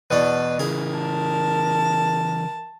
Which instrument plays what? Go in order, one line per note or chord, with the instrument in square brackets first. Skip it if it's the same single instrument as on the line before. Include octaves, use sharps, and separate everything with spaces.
[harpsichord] E2 B2 D4 [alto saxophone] B4
[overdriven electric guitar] C#3 E3 [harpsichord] G#4 [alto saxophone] A#4
[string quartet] A5